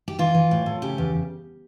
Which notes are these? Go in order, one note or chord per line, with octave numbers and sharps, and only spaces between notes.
G4
E3 F4
E3
A2
A2
C#3 G4
E2